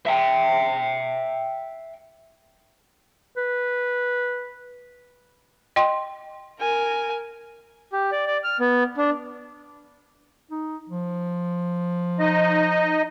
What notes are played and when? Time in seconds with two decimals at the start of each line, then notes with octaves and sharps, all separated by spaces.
0.07 E5 G5
3.37 B4
5.76 D#5 G5 C6
6.60 A#4 G#5
7.93 G4
8.12 D5
8.27 D5
8.44 F6
8.60 B3
8.97 D4
10.51 D#4
10.89 F3
12.20 D#4 D#5